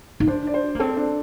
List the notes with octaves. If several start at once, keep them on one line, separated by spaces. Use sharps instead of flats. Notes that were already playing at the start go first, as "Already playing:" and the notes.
D#4
D4 C5
D5
C5
A#3
C4 A4
D4